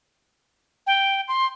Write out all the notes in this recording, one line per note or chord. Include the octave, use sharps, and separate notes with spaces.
G5
C6